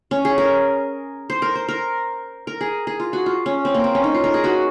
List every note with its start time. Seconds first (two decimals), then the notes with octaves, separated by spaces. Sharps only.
0.11 C#4
0.25 G#4
0.38 A#4
1.30 C5
1.42 A#4
1.55 C5
1.69 A#4
2.47 A#4
2.61 G#4
2.87 G#4
3.00 F4
3.13 F#4
3.26 F4
3.46 C#4
3.65 C4
3.74 A#3
3.84 C4
3.95 C#4
4.04 D#4
4.14 F4
4.24 A#4
4.34 G#4
4.44 F#4